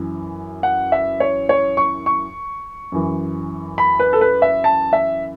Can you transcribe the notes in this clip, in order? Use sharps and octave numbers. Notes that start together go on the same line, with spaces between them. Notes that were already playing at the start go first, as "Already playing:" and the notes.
Already playing: F#2 E3
F#5
E5
C#5
C#5
C#6
C#6
F#2 E3
B5
B4
A4
B4
E5
A5
E5